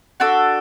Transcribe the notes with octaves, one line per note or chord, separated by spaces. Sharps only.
D4 F#4 A4 E6